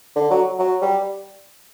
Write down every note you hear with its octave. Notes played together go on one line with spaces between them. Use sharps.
D3
F#3
F#3
G3